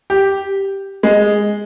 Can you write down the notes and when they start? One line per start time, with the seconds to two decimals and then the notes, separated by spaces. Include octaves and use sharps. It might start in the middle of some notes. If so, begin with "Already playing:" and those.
0.10 G4
1.03 G#3